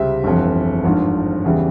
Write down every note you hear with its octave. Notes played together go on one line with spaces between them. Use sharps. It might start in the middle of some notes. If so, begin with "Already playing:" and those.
Already playing: C#2 C3 G3 C4 E5
G1 F2 E3
G#1 G2 F3
E2 C#3 E3 G3